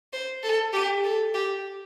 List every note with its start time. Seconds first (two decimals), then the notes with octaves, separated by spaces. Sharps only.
0.13 C5
0.43 A4
0.73 G4
1.04 A4
1.34 G4